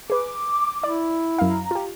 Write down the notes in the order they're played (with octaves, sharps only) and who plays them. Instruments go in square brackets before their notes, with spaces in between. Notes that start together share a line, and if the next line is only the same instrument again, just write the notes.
[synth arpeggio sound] G#4 B4 [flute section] D6
[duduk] E4 [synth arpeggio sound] D5
[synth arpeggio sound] F#2 F5 [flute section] A#5
[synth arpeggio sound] F4 G4